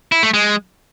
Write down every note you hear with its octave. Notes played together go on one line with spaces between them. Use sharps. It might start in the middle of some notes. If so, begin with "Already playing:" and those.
E4
A3
G#3